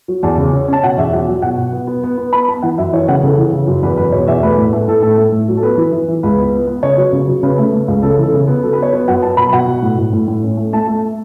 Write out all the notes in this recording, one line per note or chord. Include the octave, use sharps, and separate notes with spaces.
F#3
E2 A5
C#3
C#4
C#4 A5
B2 F#5
E2 E5
F#3 F#5
F#3
B2 F#5
B2
B3
B3
B3
B3
B3 B5
B3 A5
E3 F#5
F#2 E5
E3 C#5
C#3 F#5
C#3 A4
E3
C#3
F#2
E2 B4
E2 B4
B2 C#5
E2 E5
A3 B4
A2
A3
A2 A4
A2 A4
A3
A2
F#3
A4
B3 B4
E3
E3
E3
C#2 B4
B3
B3
B3
C#3 C#5
F#3
C#3
F#3
C#3 B4
A3
A3
C#2
C#3 A4
E3 A4
C#3
B3
F#3 A4
B4
B3 C#5
B3
F#2 F#5
F#3 A5
B2 B5
B2 F#5
B2
A2
A2
A2
A2
C#4
A3
A3 A5
A3